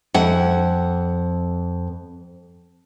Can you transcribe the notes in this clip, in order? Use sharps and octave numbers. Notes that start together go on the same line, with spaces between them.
F2 F#5